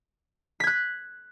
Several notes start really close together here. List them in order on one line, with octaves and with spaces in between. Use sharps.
B6 G#6 F#6